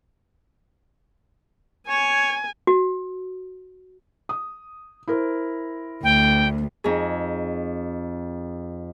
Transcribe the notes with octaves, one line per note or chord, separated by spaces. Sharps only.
C#5 G#5
F#4
D#6
E4 A#4 C5
D2 G5
F2 D#4 G#4